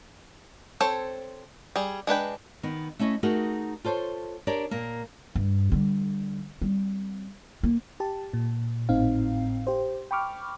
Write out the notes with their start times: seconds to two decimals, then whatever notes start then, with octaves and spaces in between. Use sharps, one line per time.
0.80 C4 A4 C5 C#5
1.76 G3 G#4
2.07 G#3 D4 B4 G5
2.63 D#3 B3
2.99 A3 C#4 E4 D#5
3.23 A3 D#4 F#4 G#4 A#4
3.84 F4 A4 C5 C#5
4.47 D4 G4 A#4 C#5 D5
4.71 A#2 A#3
5.35 G2
5.72 D3 G3
6.62 G3 C4
7.63 A#3
8.00 G4 A5
8.34 A#2
8.89 G#1 A2 C4 D#4 F5
9.67 G4 C5
10.11 G5 B5 C#6 D6 F6